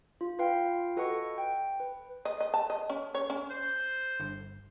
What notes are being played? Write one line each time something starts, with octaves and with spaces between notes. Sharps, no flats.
F4
F4 B4 F5 G5
F#4 A4 B4 D#5 F#5 C#6
G5
B4
D#5
D#5
A5
D#5
C#4
C#5
C#4
C5
G1